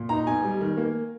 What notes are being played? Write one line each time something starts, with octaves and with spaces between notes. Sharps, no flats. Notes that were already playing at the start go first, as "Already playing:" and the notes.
Already playing: A#2
D#4 A#5
B1 G#5
G3
D#3
A#3